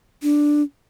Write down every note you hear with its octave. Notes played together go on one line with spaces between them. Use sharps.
D4